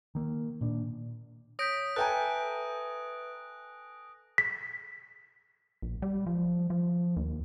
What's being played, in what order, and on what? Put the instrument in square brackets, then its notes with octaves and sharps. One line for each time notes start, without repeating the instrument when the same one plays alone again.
[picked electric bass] D#3 A#3
A#2 D4
[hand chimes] C#5 G6 B6 [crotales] D#6 A#6 D7
[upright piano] A4 G5 G#5 [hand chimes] B4 E5 A#5 [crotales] F#6
[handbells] B6
[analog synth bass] A#1
G3
F3
F3
D#2